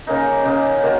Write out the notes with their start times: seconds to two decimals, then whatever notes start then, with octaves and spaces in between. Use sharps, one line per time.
0.07 C#3 A#3 D#4
0.45 C#3 A#3 D#4
0.83 D#3 A#3 F#4